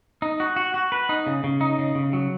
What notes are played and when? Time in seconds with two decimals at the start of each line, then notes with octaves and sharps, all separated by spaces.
0.22 D#4
0.40 F#4
0.56 F#4
0.74 F#4
0.92 B4
1.09 D#4
1.27 C#3
1.44 C#3
1.61 D#4
1.79 C#3
1.95 C#3
2.13 F#3